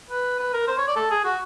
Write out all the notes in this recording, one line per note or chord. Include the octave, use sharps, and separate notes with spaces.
B4
B4
A#4
C5
C#5
D5
A4
G#4
F#4